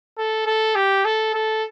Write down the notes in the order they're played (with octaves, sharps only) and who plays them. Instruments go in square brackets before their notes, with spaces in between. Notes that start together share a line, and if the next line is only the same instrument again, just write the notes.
[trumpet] A4
A4
G4
A4
A4